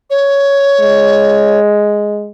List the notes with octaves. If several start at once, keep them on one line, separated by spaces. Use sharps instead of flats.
C#5
G#3